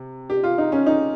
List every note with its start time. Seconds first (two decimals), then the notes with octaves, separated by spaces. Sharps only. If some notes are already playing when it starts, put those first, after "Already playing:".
Already playing: C3
0.30 G4
0.43 F4
0.58 D#4
0.72 C#4
0.86 D#4